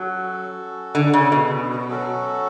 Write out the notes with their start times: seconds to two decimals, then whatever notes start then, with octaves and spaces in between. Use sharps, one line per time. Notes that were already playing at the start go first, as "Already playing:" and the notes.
Already playing: F#3 C#4 F#4 A4
0.95 D3
1.13 C#3
1.32 B2
1.88 F#3 C#4 F#4 A4